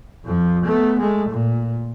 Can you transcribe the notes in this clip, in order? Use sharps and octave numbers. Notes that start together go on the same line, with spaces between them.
F2 F3
A3 B3
G#3 A3
A#2